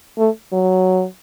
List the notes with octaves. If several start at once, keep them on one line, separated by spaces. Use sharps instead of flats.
A3
F#3